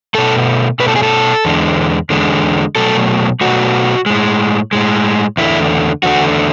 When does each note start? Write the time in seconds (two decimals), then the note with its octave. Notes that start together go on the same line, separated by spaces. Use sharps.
0.15 B2 A3 A4
0.80 B2 A3 B4
0.88 A4
0.96 G#4
1.03 A4
1.45 E2 D3 G#3
2.10 E2 D3 G#3
2.76 B2 F#3 A3 A4
3.41 B2 F#3 A3 F#4
4.06 A2 G#3
4.73 A2 G#3
5.37 E2 D3 A3 E4
6.03 E2 D3 A3 F#4